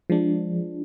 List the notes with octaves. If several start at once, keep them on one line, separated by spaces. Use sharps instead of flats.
F3 G#3 D4